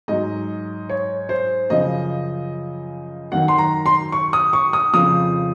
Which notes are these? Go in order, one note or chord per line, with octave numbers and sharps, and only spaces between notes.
G#2 F#3 D#5
C#5
C5
F#2 C#3 F3 D#5
F#2 D#3 F#3 F#5
C6
A#5
C6
C#6
D#6
C#6
D#6
F2 C#3 F3 D#6